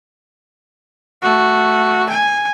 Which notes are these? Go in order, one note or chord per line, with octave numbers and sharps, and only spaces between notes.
A3 F#4
G#5